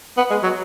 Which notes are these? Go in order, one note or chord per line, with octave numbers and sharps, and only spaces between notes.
B3
G#3
F#3